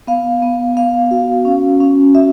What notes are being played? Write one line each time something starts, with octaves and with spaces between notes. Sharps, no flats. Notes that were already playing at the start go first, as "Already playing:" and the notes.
B3 F5
B3
B3 F5
F#4
C#4
C#4
F#4 E5